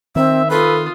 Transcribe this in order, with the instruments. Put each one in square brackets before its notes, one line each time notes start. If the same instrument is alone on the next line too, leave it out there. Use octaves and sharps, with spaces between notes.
[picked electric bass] D#3 [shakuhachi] C4 [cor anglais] E5
[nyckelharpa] F4 D#6 [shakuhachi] A4 [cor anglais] B4